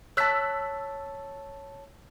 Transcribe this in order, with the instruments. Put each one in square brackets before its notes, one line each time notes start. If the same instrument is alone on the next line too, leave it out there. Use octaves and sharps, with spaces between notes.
[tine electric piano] C#5 A5 [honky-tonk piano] E6 F#6 B6